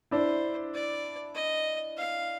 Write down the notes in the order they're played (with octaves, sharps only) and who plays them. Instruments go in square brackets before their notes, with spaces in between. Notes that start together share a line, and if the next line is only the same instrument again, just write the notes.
[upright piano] D4 E4 [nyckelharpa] C5
[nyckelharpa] D5
D#5
F5